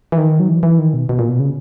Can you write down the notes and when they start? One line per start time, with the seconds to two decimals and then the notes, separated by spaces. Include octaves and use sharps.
0.12 E3
0.18 D#3
0.40 F#3
0.49 E3
0.63 E3
0.79 D#3
0.94 B2
1.09 B2
1.19 A#2
1.29 B2
1.40 C#3